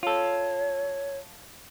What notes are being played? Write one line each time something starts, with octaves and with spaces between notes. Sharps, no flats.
F4 A4 C#5